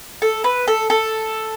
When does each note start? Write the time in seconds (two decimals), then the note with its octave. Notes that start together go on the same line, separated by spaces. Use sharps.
0.22 A4
0.44 B4
0.68 A4
0.90 A4